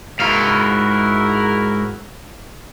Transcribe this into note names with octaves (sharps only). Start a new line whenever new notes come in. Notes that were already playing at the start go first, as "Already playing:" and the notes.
G#2 E4 F#4 A#4 F5